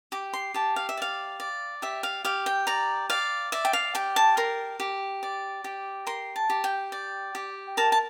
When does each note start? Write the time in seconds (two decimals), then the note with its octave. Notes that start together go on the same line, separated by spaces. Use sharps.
0.12 G4 D6
0.33 C6
0.54 G4 A5
0.76 F5
0.89 E5
0.97 D5 F5
1.40 D5
1.82 G4 E5
2.03 F5
2.25 G4 F5
2.46 G5
2.67 D5 A#5
3.10 D5 F5
3.52 D5 E5
3.65 G5
3.73 F5
3.95 G4 G5
4.16 A5
4.37 A#4 C6
4.80 G4
5.23 D5
5.64 G4
6.07 A#4 C6
6.36 A5
6.50 G4
6.64 G5
6.92 D5
7.35 G4
7.77 A#4 A5
7.92 A5